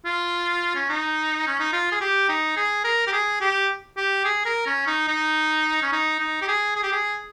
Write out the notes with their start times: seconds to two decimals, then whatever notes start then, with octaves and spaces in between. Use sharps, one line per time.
0.05 F4
0.76 C#4
0.89 D#4
1.47 C#4
1.60 D#4
1.73 F4
1.92 G#4
2.01 G4
2.29 D#4
2.57 G#4
2.85 A#4
3.07 G4
3.13 G#4
3.41 G4
3.97 G4
4.25 G#4
4.46 A#4
4.66 C#4
4.87 D#4
5.08 D#4
5.83 C#4
5.93 D#4
6.20 D#4
6.42 G4
6.48 G#4
6.76 G#4
6.83 G4
6.92 G#4